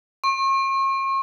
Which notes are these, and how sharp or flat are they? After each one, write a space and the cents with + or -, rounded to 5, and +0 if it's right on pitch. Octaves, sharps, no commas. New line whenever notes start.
C#6 -40